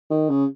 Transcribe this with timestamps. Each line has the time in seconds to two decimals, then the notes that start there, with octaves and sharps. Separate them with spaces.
0.11 D#3
0.30 C#3